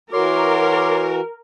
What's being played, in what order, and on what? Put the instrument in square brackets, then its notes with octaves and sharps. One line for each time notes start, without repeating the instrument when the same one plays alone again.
[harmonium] E3 F#4 [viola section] A#4 [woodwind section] C#5 C6 D6